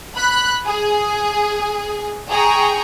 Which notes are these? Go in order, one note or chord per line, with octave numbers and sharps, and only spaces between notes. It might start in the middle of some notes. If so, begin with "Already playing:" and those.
B5 F#6
G#4
G#4 G5 A#5 C#6